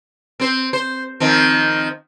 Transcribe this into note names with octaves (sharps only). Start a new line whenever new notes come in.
C4 C5
C5
D#3 F3 C4